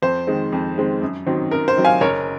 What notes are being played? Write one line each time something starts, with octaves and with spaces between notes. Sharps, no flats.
F2 C5
D#3 G#3 C4
F2
D#3 G#3 C4
F#2
D#3 F#3 C4
F#2 A#4
C5
D#3 F#3 C4
F5 G#5
F#1 A#4 C#5